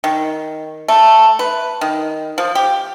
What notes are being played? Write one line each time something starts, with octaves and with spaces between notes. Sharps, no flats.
D#3
A3
B4
D#3
F3
G4